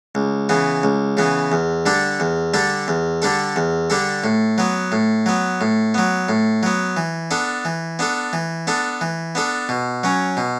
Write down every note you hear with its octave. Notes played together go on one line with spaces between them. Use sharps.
C#2
C#3 E3 B3
C#2
C#3 E3 B3
E2
D3 G3 D4 A4
E2
D3 G3 D4 A4
E2
D3 G3 D4 A4
E2
D3 G3 D4 A4
A2
F#3 B3
A2
F#3 B3
A2
F#3 B3
A2
F#3 B3
E3
B3 D4 A4
E3
B3 D4 A4
E3
B3 D4 A4
E3
B3 D4 A4
B2
F#3 C#4
B2